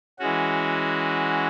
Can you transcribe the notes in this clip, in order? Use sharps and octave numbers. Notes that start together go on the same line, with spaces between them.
E3 G#3 C#4 F#4